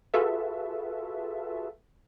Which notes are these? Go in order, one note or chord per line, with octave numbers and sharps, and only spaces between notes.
F4 F#4 G#4 A4 B4 E5